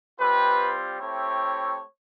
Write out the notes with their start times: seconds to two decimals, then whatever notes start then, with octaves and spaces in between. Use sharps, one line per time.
0.20 G3 C4 F4 B4
1.00 A3 C4 E4 G4 C#5